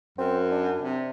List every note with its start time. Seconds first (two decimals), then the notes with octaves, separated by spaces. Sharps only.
0.18 F#2 C4
0.51 D4
0.82 C3